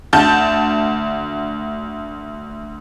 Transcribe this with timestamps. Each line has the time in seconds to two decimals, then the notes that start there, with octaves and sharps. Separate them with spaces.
0.13 D2 A5 G6